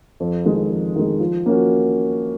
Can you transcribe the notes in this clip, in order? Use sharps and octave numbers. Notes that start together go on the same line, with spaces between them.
F2
D#3 G#3
F2
D#3 G#3
F3
A#3 C#4 F#4